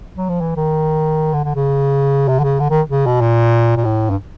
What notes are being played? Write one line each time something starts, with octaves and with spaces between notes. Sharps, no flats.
F#3
F3
E3
D#3
D3
D3
C#3
C3
D3
C#3
D3
D#3
C#3
B2
A#2
A#2
A2
G2